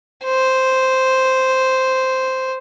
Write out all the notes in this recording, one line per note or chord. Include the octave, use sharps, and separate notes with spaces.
C5